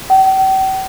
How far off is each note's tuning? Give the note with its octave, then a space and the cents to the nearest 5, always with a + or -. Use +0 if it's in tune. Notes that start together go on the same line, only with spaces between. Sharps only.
G5 -40